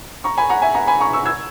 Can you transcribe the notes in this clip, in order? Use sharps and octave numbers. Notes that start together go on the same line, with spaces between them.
A#5 C#6
G#5 B5
F#5 A#5
E5 G#5
F#5 A#5
G#5 B5
A#5 C#6
C#6 E6
E6 G#6